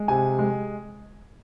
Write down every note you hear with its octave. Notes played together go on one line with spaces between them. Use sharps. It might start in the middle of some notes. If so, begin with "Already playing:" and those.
Already playing: G#3
C3 G#5
G#3